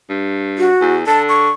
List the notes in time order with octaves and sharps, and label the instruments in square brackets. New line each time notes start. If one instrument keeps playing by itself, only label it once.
[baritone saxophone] G2
[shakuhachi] F#4
[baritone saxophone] E2
[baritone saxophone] D3 [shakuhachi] A5
[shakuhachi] C#6